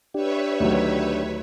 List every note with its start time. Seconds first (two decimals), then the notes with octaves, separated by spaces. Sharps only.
0.14 D4 G4 B4 C#5 E5
0.60 D2 D#3 F#3